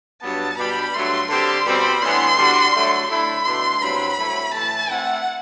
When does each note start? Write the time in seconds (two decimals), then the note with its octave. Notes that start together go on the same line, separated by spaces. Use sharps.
0.21 G2 F#3 B3 A5
0.57 B2 G3 D4 G4 B5
0.93 G2 F#3 A3 C6
1.29 D3 G3 C4 G4 C6
1.66 B2 G3 C4 B5
2.01 A2 E3 B3 D4 C6
2.37 D3 G3 D4 F#4
2.74 D3 F#3 A3
3.10 D3 A3 E4 B5
3.45 B2 A3 D4 C6
3.81 G2 F#3 C4 E4 B4 B5
4.18 C3 F#3 A3 E4
4.54 A2 E3 A3 A5
4.90 A3 C4 E4 F#5